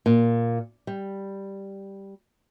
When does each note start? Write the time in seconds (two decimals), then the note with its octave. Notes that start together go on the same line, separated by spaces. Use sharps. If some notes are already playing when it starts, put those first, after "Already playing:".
0.06 A#2
0.87 G3